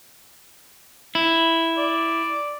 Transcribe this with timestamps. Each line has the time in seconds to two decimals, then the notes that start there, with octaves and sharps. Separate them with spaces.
1.15 E4
1.77 D5